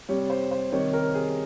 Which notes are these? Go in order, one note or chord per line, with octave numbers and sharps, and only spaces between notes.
C3 G3 C#5
C5
C5
C3 D#3 G3 C#5
A#4
G#4